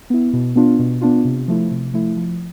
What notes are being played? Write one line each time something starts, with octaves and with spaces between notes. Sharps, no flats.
B3 E4
B2
B3 D4 F4
B2
B3 D4 F4
C3
F3 A3 E4
C3
F3 A3 E4
F3